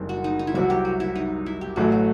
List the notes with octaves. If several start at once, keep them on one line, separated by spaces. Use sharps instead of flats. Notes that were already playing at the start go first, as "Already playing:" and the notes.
Already playing: F#1 F#2 D#3 G3 C4
F#4
D#4
D#4
E4
C2 C3 F#3 F#4
G4
F#4
E4
D#4
E4
G4
A1 A2 F#3 A3 F#4
F#4